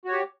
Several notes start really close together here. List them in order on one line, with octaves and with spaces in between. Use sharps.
F#4 C#5 G4